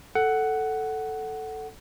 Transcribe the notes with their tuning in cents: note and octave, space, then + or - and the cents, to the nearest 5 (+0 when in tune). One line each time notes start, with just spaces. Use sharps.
A4 +0 F#5 +10